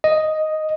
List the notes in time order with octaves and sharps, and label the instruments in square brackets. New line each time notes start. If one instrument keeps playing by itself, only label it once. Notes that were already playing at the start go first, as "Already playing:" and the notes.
[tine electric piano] D#5